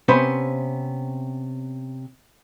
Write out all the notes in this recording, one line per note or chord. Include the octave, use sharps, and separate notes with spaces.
C3 B3 C#4 C5 B5